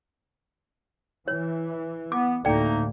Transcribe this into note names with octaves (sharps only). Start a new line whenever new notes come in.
E3 C#5
B3 D6
D2 A2 A3 A#3 D#4 D5 G5